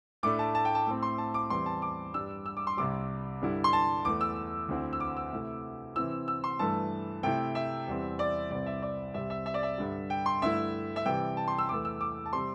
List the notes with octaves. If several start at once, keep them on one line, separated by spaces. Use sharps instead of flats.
A2 A3 D4 D6
A5
A5
G5
A5
A2 A3 C4
C6
A5
D6
E2 E3 G3 C4 E4 C6
A5
D6
G2 G3 D4 E6
E6
D6
C6
C2 C3 G3 D6
G2 D3 G3 E4
C6
A5
E2 E3 A3 D6
E6
D2 D3 C4 E4
E6
D6
E6
C3 A3 E4
C3 E3 C4 E4 E6
E6
C6
G2 E3 A3 A5
C3 A3 E4 G5
E5
E2 E3 G3 C4
D5
C2 C3 E3 C4 D5
E5
D5
C2 C3 G3 C4 E5
E5
E5
D5
E5
G2 D3 G3
G5
C6
G2 D3 A3 E4 E5
E5
C3 E3 G3 G5
A5
C6
E6
E2 E3 A3 D6
E6
D6
A5
C3 G3 C4 C6